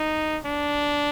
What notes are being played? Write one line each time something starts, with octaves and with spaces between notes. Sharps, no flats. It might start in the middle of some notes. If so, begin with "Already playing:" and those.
Already playing: D#4
D4